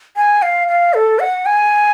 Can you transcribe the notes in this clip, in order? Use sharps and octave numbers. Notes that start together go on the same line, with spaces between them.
G#5
F5
F5
A4
F#5
G#5